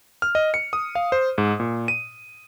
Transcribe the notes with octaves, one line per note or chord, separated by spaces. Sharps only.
F6
D#5
C#7
D#6
F5
C5
G#2
A#2
D#7